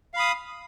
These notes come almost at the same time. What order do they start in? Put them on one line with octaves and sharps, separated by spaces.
F5 B5 D#6